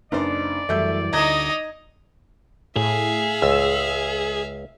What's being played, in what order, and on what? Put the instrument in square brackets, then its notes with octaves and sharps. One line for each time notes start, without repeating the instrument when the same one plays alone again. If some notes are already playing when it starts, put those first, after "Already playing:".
[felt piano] F#1 D4 [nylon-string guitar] D#4 B4 C5 [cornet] D5
[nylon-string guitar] F#2 E3 G3 [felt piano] A3 E5 G6
[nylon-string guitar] D2 D3 [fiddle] D#4 D#5 [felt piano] A#5 G#6
[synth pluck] A2 [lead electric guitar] G#4 [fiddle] E5 F5
[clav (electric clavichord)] C#2 [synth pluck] E6